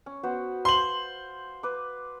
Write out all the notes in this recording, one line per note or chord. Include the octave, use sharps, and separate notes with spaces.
C#4
B3 F#4 C5
C5 F5 C6 F#7
B4 D6